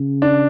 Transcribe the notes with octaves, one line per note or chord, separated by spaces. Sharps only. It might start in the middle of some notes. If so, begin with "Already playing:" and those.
Already playing: C#3
D4